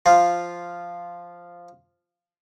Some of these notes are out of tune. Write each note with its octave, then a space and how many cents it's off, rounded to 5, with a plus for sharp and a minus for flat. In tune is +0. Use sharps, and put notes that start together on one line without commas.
F3 +0 F4 -5